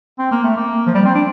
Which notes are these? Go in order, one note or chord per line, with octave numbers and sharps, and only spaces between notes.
C4
A#3
A3
A#3
F3
G3
C4
D4